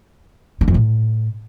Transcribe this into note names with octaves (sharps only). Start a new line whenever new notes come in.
D3
F2
A2